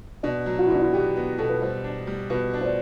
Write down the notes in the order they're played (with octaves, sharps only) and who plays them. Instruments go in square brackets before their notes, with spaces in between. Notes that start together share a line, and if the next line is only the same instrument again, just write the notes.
[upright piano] B2 [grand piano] D4
[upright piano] F#3
[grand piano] F#4
E4
[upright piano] B2 [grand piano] D4
[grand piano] E4
[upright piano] B3 [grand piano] G4
[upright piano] B3
[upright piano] B2 [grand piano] A4
[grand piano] B4
[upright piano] G3 [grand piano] C5
[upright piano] D4
G3
[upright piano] B2 [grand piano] B4
[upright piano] D4
[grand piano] C5
D5